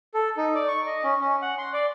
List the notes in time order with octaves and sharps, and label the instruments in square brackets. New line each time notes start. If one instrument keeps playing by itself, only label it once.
[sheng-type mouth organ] A4
D#4
D5
C#6
D#5
C#4
C#4
F#5
C6
D5